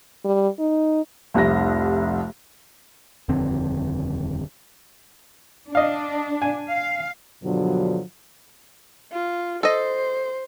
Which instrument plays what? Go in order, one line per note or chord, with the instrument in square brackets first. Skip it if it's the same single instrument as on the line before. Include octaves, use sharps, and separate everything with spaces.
[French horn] G3
D#4
[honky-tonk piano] F1 C2 F3 E5 A#6
[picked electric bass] D#1 F2 D3 C4
[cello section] D4 [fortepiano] D#5 F5
[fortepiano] G#5
[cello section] F5
[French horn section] G2 B2 D3 F3 F#3
[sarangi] F4
[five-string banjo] A4 D#5 [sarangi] C5